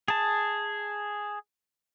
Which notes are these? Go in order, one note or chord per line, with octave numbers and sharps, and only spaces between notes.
G#4 A5